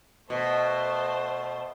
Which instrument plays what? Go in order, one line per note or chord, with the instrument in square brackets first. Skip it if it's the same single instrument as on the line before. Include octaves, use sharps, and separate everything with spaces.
[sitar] B2 [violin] A3 C5